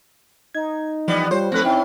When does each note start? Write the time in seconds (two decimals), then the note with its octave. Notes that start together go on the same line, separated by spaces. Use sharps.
0.54 D#4 G#6
1.08 E3 F3 G3 B3 D5
1.31 G3 F4 C5 C#5
1.52 F2 A3 C4 D#4 B4 A#6
1.65 C#4 E4 G5